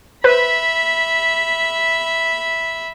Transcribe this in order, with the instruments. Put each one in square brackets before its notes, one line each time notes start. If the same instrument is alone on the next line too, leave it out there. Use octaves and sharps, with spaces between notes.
[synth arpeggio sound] B4 C5 [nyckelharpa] E5 B5